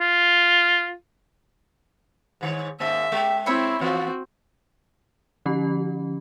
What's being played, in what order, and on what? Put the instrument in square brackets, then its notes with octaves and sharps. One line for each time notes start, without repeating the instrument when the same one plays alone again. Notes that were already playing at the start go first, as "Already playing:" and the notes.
[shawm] F4
[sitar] G#2 D#3 C#5
[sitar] D#2 G#2 A#3 [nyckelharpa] E5
[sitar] G#3 [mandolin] G4
[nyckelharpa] C4 E4 [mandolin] C#5 E5 B5
[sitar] E3 F3 B3 [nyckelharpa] C4 F#4
[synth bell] D3 F3 C#4 G4 B5